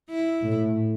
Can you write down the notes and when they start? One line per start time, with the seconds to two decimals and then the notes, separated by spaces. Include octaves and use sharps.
0.10 E4
0.42 A2